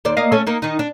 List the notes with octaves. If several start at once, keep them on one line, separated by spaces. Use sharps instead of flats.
D#2 C5 D5
A#3 D#5 F5
A3 C#4 A4
A#3 D#4
D#3 D#4
D4